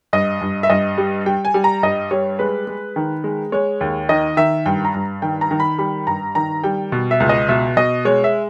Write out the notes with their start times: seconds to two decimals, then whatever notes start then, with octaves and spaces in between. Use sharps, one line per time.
0.13 G2 D#5
0.41 G2
0.63 E5
0.70 G2 D#5
0.98 G3
1.26 G3 G5
1.45 G#5
1.54 G3
1.64 A#5
1.83 G2 D#5
2.11 G3 C#5
2.39 G#3 B4
2.67 G#3
2.96 D#3
3.24 G#3
3.52 G#3 C#5
3.81 D#2
4.09 D#3 D#5
4.37 D#3 E5
4.66 G2 G5
4.85 A#5
4.94 G2
5.22 D#3 G5
5.41 A#5
5.51 D#3
5.60 B5
5.78 G3 B5
6.07 G2 A#5
6.35 D#3 A#5
6.64 G3 G5
6.92 B2
7.11 E5
7.20 C#2
7.29 D#5
7.49 B2 E5
7.77 B2 D#5
8.05 G#3 C#5
8.24 E5